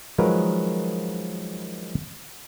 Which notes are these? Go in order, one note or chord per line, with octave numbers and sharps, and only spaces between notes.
D#3 F3 F#3 G#3 A#4 B4